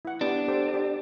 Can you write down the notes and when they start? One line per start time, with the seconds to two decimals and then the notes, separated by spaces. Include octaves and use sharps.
0.05 E4 F#5
0.21 B3 D4 G4 B5
0.48 G4 A4 C5
0.74 G4